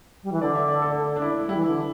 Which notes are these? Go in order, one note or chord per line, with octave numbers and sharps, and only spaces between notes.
G3
E3
D3 D5
E5
D5
A4
D4
E4
G3 E4
E3
D3